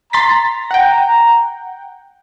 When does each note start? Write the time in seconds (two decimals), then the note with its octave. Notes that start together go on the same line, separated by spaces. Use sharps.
0.13 A#5 C6 A6 B6
0.71 F#5 G5